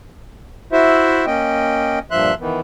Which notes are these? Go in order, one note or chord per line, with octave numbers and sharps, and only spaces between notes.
E4 F#4 C5 E5
A#3 C#4 D#5 G5
G2 A#2 F3 E5 C6 F#6
D#3 E3 B3